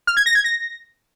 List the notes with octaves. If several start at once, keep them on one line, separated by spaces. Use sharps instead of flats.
F6
G#6
A#6
G#6
A#6